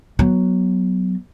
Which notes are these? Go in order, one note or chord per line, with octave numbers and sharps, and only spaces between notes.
F#3 B3